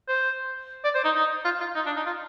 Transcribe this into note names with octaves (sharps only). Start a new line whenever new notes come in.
C5
D5
C5
D#4
D#4
F4
F4
D#4
D4
D#4
F4